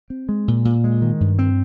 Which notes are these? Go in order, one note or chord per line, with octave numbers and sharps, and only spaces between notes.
C4
G#3
A#2
A#2
G#3
D#3
G2
C4